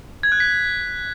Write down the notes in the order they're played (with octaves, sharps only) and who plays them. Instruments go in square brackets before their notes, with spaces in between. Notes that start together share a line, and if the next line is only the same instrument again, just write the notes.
[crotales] G#6
F#6
B6